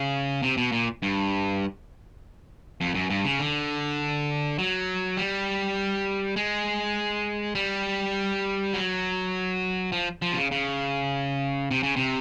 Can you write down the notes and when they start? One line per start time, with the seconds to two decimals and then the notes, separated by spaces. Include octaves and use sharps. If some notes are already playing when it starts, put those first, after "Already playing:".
Already playing: C#3
0.43 C3
0.57 B2
0.72 A#2
1.02 G2
2.81 F2
2.95 F#2
3.10 G2
3.25 C#3
3.39 D3
4.59 F#3
5.17 G3
6.36 G#3
7.55 G3
8.74 F#3
9.92 F3
10.22 F3
10.33 C3
10.37 C#3
10.51 C#3
11.71 C3
11.83 C#3
11.96 C3